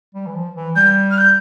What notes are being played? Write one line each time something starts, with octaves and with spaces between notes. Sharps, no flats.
G3
E3
F3
E3
G3 G6
F6
G6